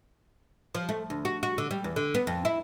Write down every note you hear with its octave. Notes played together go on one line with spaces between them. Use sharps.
F3
A3
D2
F#4
F#4
D3
G3
E2
D3
B3
F2
E4